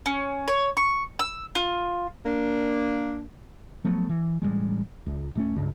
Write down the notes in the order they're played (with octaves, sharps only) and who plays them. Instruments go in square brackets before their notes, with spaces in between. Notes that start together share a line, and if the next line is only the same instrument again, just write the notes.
[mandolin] C#4
C#5
C#6
E6
F4
[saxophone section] A#3 D4
[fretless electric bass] F3 F#3 A3 B3
E3
A1 A#2 G3 G#3
C#2
D1 A3 C#4
C#2 G2